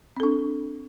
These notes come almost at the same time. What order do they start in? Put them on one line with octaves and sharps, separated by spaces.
C4 A4 D4